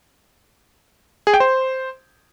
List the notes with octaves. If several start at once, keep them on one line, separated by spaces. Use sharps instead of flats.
G#4
G5
C5